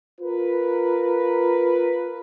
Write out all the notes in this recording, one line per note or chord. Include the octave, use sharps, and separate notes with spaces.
F4 A#4 B4